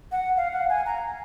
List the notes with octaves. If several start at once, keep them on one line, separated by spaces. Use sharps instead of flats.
F#5
F5
F#5
G#5
A#5